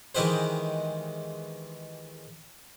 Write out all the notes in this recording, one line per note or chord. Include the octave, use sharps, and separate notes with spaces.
D#3 E3 G#3 G4 B4 C5